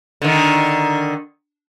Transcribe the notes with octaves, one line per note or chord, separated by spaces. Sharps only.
D3 D#3